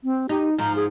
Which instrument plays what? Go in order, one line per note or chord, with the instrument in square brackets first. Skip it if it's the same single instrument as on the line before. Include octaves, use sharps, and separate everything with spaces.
[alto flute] C4
[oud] D#4 [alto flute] G4
[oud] G#2 F3 [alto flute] A#5
[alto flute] G#4